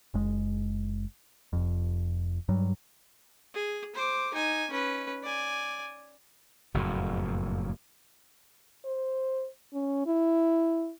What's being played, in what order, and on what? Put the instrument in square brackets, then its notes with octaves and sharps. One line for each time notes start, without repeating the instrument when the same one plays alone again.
[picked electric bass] F#1 G#3
F1 F2
G2 F#3 G3
[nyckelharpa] G#4
C5 D6
D#4 G#5
C#4 B4
D5 G#5
[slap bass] F#1 F2 A2
[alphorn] C5
C#4
E4